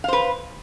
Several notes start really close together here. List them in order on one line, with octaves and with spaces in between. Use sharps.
F5 C5 B4